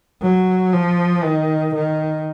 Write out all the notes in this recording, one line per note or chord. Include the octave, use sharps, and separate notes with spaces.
F#3
F3
D#3
D#3